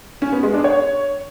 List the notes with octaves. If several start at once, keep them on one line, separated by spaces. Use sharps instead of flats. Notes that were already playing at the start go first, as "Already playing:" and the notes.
C#4
B3
G#3
D4
C#5